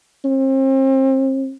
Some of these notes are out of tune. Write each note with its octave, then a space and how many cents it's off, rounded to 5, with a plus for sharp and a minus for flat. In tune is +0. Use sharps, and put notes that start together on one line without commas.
C4 +35